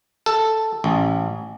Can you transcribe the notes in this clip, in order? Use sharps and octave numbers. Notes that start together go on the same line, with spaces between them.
A4
A1